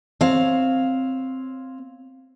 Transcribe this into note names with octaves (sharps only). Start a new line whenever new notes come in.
C4 C#5 F5